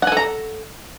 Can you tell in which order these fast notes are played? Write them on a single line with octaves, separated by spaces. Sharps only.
F#5 G#5 A4 A#5